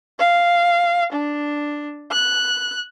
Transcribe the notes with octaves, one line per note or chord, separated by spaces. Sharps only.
F5
D4
F#6